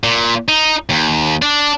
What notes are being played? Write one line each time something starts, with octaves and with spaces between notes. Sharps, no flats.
A#2
D#4
D#2
D4